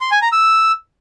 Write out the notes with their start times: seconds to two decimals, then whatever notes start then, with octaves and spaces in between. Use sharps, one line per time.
0.01 C6
0.11 G#5
0.22 A#5
0.32 E6